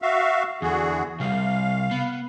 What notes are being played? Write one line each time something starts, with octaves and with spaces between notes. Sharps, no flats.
F#4 E5 F5
E2 D3 F#4 G#4
C3 G3 F5
B3